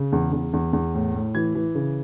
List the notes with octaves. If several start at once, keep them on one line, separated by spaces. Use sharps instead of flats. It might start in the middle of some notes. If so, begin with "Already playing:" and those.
Already playing: C#3
E2
E2
E2
E2
A2
A2
E3 G#6
E3
C#3